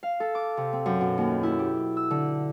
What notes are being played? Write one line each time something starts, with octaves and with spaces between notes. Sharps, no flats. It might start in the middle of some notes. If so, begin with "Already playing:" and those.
F5
A4
D6
C3
C4
F#2
B2
D#2
E4
G4
E6
D3